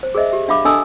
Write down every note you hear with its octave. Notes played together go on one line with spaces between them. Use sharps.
C5
G#4 A#4 C5 D#5 E5
G4 E5
D4 E5 F5 B5 D6
D4 A4 D#5 G#5 A5 E6